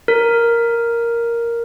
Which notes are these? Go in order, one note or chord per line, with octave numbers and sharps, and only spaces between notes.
A#4